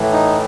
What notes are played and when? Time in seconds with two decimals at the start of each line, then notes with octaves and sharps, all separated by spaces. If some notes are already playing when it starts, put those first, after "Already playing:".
Already playing: A2 E3
0.12 D#4